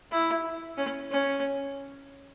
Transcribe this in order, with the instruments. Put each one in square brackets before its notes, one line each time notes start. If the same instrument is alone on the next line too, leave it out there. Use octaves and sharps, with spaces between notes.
[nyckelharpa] E4
C#4
C#4